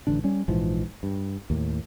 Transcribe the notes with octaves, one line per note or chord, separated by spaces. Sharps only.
A1 D3 D4
G3 C#4
A#1 G#2 E3 F3
G2
D#2 A2